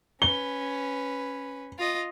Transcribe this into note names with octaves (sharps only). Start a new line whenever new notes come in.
C#4 B4 G7
F4 D#5